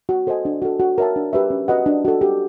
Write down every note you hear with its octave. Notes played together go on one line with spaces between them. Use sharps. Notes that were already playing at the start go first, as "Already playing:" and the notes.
F#4
A4 C5 D#5 G#5
D4
F#4 A4
F#4
A#4 C#5 E5 A5
D4
G4 B4 E5
C#4
F#4 B4 D#5 F#5
D4
F#4 A4
G4